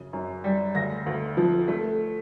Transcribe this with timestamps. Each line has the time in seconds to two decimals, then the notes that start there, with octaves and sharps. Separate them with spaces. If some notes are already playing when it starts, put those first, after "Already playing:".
Already playing: F#2 C#3
0.13 F#2
0.44 G3
0.75 D2 A#6
1.06 D2
1.37 F3
1.68 A3